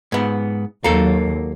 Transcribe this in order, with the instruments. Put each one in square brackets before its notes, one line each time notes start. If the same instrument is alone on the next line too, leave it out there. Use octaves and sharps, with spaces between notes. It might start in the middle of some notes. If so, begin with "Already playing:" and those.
[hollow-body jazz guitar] G#2 B3
[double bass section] D#2 F#3 [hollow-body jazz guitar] A#3 A4